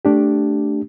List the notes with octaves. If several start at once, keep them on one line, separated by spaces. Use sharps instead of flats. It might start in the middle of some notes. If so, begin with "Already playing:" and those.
A3 D4 G4